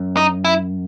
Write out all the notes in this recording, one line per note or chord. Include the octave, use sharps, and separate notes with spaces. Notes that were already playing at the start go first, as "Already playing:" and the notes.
Already playing: F#2
D#4
E4